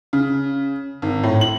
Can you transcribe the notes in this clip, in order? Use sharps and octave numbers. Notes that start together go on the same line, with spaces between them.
C#3
G#1
A2
F#7